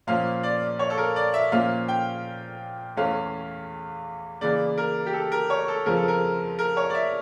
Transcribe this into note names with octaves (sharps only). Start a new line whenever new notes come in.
A#2 F3 A#3 C#4 F5
D5
C#5
A4
A#4
D5
E5
A#2 F3 A#3 C#4 F5
G5
E2 E3 A3 C#4 F5
C#3 E3 A#3 D5
A#4
G4
A4
A#4
C#5
A4
F2 C#3 F3 A#4
A4
A#4
A#4
C#5
D5
E5